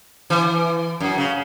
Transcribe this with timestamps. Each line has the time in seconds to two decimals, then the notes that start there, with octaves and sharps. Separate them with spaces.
0.30 E3
1.00 F#2
1.18 C#3